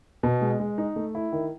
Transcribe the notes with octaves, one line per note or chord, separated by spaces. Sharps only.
B2
G#3
G#3
D#4
A3
E4
D#3